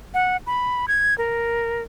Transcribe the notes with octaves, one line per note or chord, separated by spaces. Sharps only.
F#5
B5
G#6
A#4